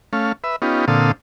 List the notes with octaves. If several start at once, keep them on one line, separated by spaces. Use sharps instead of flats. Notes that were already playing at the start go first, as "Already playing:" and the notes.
A3 C#4 F5
B4 E5
B3 C#4 D#4 F4 G4
A#2 D3 C4 A4 F5 D#6